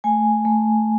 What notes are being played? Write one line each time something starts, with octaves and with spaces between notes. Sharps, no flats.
A3 G#5
A3